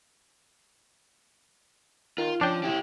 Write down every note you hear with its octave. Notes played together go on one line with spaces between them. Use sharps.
D#3 F4
F3 C#4 D4 G5
E4 G4